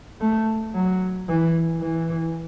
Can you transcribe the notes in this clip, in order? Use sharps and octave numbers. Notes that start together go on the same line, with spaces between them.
A3
F#3
E3
E3